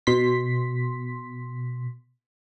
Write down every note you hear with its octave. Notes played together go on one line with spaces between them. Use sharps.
B2 C6 B6